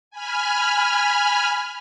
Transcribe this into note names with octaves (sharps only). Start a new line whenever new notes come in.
G#5 B5 F6